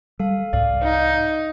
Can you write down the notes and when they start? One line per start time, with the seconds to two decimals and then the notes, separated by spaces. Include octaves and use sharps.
0.20 G3 A4 F5
0.53 C2 G#2 D5 F5
0.82 D#4